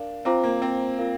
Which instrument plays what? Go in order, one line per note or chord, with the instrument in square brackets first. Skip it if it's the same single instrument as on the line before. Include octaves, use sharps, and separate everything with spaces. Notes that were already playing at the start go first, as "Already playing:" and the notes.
Already playing: [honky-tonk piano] D4 [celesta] A#4 F5
[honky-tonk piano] C4 [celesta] F4 C5 F5 A#5 D6
[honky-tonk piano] A#3
C4
[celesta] F4 A#4 F5